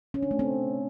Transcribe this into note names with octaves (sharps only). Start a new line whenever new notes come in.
C#4
D4
A3
C4